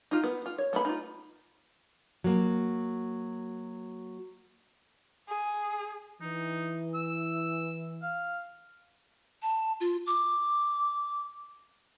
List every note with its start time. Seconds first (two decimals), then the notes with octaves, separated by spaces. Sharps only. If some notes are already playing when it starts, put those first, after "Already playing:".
0.11 D#4 F4
0.24 B3
0.46 F4
0.58 C#5
0.73 A3 B3 B5
0.85 D#4 F4
2.24 F#3 A#3
5.29 G#4
6.21 E3 D#4
6.94 E6
8.02 F5
9.42 A5
9.81 F4
10.07 D6